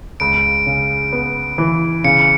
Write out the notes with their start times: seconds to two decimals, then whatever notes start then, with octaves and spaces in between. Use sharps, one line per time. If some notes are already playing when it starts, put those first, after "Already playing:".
0.20 C#2 D7
0.66 C#3
1.13 B3
1.58 E3
2.04 C#3 C#7